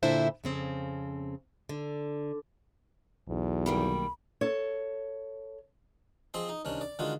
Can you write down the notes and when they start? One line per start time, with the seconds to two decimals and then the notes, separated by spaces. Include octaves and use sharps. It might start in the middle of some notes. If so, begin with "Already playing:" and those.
0.03 A#2 D3 D4 E4 C5 E5
0.44 F2 C#3 C4
1.69 D3
3.28 B1 E2
3.66 D#3 G3 A#3 B5
4.41 A4 C#5
6.34 F3 C4 G#4 D#5 C6
6.49 D#4
6.65 C2 D#3 C#4 D4
6.81 D5
6.99 D3 D#3 G#3 F4 F#4